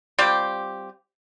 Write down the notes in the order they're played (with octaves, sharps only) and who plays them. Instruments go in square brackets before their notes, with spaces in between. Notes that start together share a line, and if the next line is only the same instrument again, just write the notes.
[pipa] G3 C4 F4 G4